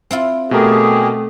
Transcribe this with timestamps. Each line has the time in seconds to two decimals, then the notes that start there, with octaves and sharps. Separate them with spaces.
0.11 C4 E4 F4
0.51 B2 A3 G4 G#4 A#4